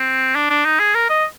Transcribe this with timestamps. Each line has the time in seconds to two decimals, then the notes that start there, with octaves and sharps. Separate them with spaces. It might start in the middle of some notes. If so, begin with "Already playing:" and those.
Already playing: C4
0.35 D4
0.50 D4
0.65 D#4
0.79 G#4
0.95 A#4
1.09 D#5